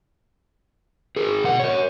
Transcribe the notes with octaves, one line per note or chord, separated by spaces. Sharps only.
G#4 A#4
B2 F#5
A#4 C#5